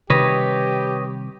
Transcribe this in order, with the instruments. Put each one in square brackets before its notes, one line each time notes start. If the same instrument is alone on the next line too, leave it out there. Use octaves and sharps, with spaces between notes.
[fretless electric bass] C3 D#3 G3 [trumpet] G4 [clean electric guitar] B4 C#5 D#5